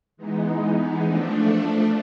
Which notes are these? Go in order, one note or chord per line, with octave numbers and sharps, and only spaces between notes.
E3 G#3 B3 D#4
F3 A3 D4